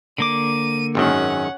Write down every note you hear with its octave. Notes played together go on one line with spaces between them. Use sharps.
D3 A#3 D6 D#7
G#1 F#2 D#3 C#4 F#5